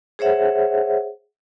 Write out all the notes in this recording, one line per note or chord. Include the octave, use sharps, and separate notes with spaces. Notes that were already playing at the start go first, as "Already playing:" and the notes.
G#4 C5 C#5 E5 F#5